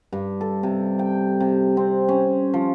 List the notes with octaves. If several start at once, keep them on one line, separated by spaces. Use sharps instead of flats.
G2
A4
C3
G5
C3
C4
C#4
F3